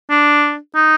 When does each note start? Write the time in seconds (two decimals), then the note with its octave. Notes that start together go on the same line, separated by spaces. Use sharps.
0.10 D4
0.75 D#4